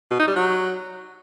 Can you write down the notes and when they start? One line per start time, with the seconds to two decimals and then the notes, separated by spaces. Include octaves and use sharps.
0.11 B2
0.19 D#4
0.28 G3
0.36 F#3